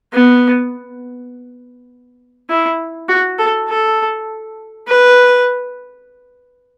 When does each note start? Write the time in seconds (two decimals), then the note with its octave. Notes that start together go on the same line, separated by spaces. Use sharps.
0.13 B3
2.50 E4
3.08 F#4
3.39 A4
3.69 A4
4.87 B4